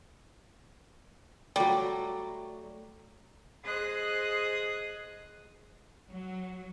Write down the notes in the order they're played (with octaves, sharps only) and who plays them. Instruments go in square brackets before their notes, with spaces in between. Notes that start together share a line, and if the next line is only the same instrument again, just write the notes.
[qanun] F#3 A3 [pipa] G3
[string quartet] G#4 C5 D#5 D#6 F#6
[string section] F#3